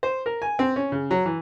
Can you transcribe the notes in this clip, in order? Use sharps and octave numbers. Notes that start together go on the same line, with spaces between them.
C5
A#4
G#5
C4
C#4
C#3
F#3
E3